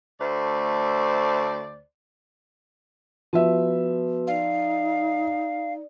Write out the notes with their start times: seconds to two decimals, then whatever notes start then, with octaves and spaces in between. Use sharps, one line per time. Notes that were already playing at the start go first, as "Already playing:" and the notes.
0.19 D2 A3 C5 D5
3.33 F3 B3 F#4 B4 E5
4.27 D#4 D5 F5